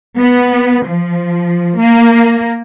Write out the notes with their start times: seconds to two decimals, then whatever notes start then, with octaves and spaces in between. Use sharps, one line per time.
0.18 B3
0.85 F3
1.78 A#3